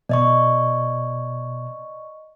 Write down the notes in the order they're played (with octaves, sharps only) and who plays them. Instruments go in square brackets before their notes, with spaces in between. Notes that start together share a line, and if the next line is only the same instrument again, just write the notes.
[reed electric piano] B2 [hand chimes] D5 D#5 C#6